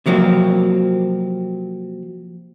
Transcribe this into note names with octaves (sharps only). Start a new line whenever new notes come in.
C3 F3 F#3 A#3 C4